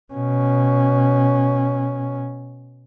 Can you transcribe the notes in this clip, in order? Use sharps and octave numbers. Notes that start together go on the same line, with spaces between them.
B2 C#4